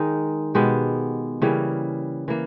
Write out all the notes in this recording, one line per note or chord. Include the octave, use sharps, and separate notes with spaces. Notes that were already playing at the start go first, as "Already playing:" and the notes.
Already playing: D#3 G#3 D#4
B2 G#3 B3 G4
C#3 E3 G3 A#3
E3 A#3